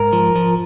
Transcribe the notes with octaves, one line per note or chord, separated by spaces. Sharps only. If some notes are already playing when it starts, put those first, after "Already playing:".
Already playing: G#2 A#4
F3
F3